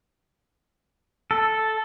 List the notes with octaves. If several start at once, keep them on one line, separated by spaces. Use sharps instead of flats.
A4